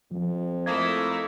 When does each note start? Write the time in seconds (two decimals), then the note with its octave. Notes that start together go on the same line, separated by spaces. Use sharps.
0.11 F2 F3
0.66 A3 A#3 E4 D#5 G#6